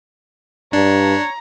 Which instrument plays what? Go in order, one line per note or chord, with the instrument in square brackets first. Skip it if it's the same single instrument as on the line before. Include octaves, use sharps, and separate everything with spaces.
[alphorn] G2 [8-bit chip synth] D4 [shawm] C#5 [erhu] A#5